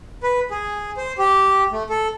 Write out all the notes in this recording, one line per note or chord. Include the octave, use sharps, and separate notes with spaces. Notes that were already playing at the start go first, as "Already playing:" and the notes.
B4
G#4
C5
G4
A3
A4